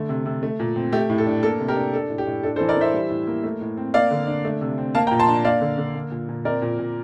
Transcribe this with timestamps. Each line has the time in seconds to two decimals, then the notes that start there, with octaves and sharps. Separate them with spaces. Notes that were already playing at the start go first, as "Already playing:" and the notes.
Already playing: D3 A3
0.09 C3
0.26 C3
0.43 A3
0.60 A#2
0.76 C4
0.92 A3 G4
1.10 A2
1.18 A4
1.27 D4
1.43 A#3 A4
1.60 C3
1.68 G4 A#4
1.77 D4
1.93 D4 A4
2.10 A2
2.18 G4
2.27 A2
2.43 D4 A4
2.56 A4 C5
2.60 E3
2.68 A#4 D5
2.76 E3 C5 E5
2.94 G3
3.10 A2
3.27 A#3
3.44 A3
3.61 A2
3.77 C4
3.94 A#3 D5 F5
4.11 D3
4.27 D4
4.45 A3
4.61 C3
4.78 C4
4.95 A#3 F5 A5
5.07 G5 A#5
5.11 A#2
5.19 A5 C6
5.28 D4
5.44 A#3 D5 F5
5.61 D3
5.78 D3
5.95 A#3
6.11 A#2
6.29 A#2
6.45 C4 A#4 D5
6.62 A#2
6.79 A#2